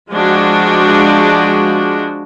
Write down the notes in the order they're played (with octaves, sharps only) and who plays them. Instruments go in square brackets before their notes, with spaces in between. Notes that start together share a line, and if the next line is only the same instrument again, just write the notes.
[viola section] F3 G#3 D4 F#4